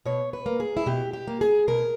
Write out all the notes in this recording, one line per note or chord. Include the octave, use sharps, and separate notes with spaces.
B2 C#5
B4
A#3
G#4
E4
B2 G4
G4
A#3
G#4
B2 A#4